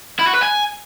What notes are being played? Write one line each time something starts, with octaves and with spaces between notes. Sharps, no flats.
E4
F#4
B4
G#5